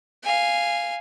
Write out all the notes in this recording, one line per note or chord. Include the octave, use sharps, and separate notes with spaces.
F5 G#5